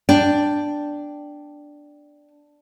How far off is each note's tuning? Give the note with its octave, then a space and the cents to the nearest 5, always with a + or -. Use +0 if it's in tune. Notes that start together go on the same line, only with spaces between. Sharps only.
D4 +0 G5 +0